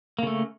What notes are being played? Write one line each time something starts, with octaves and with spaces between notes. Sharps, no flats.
C#3 A3 A#3